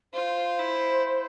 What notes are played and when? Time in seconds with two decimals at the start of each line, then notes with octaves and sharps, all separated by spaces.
0.13 F4 C5
0.59 E4